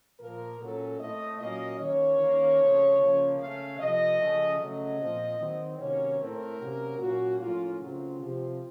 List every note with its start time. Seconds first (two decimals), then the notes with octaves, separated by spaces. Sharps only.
0.20 A#2 F3 A#3 A#4
0.60 A#2 F#3 A#3 C#4 A4
1.00 A2 A3 C4 D#5
1.40 A#2 F#3 A#3 C#4 D#5
1.80 D#3 A#3 C#4 C#5
2.19 D#3 A#3 C#4
2.60 C#3 F3 A3 C4
2.99 C#3 F3 A#3
3.39 C#3 A3 C#4 F5
3.79 C3 F3 A3 C4 D#5
4.19 C#3 F3 A3 C#4
4.59 C#3 F#3 A3 D#5
4.99 A#2 F3 C4
5.39 D#3 F#3 C4
5.79 C3 D#3 F#3 A#3 C#4 C#5
6.19 A2 A3 C4 A#4
6.59 C3 F#3 A#3 C#4
6.99 A#2 F#3 A#3 C#4 F#4
7.39 A2 F3 A#3 C#4 F4
7.78 C#3 F#3 A3 C4 F4
8.19 C3 F3 C4